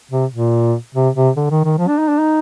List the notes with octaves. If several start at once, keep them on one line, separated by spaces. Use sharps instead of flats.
C3
A#2
C3
C3
D3
D#3
D#3
F3
D4
D#4
D4
D#4